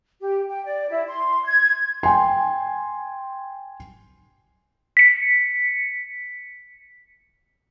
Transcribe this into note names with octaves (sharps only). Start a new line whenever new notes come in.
G4
G5
D5
E4
C6
G#6
G5 G#5 C6
B6 C#7